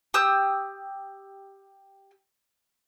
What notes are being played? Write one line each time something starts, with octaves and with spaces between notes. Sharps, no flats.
G4 D#6 E6